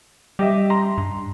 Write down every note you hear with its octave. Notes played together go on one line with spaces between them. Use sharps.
G3 G4 D#5 E5
A#5 C6
G2